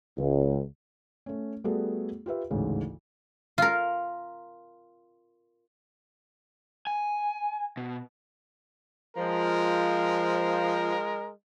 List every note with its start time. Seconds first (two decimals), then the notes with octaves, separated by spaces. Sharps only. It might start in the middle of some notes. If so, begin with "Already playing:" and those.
0.18 C#2
1.26 A3 C#4
1.64 G3 A3 B3 F#4 G#4 A4
2.26 F4 G4 B4 E5
2.51 A1 D2 G#2 C#3
3.58 F4 A#4
6.87 G#5
7.77 B2
9.16 F3 G#3 A#4